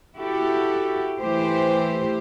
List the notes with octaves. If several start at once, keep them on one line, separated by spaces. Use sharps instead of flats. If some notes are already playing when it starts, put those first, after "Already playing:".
E4 F#4 G4 A4
E3 A3 G4 C5